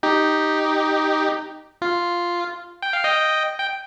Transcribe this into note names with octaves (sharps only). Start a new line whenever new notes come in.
D#4 G4
F4
G5
F5
D#5 G5
G5